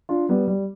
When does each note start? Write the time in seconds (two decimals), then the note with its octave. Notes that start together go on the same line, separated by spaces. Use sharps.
0.09 D4 F4
0.29 G3 B3
0.48 G3